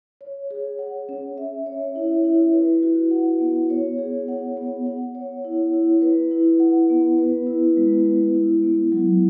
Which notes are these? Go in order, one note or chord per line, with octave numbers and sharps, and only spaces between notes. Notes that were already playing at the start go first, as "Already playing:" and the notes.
C#5
G#4
F#5
C#4
E5
C#5
E4
E4
B4
F#4
F#5
B3
C#5
G#4
F#5
B3
F#5
C#5
E4
E4
B4
E4
F#5
B3
B4
E4
G#3
G#3
E4
B3
F#3